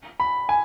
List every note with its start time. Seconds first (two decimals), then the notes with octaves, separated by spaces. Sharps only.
0.20 B5
0.49 G#5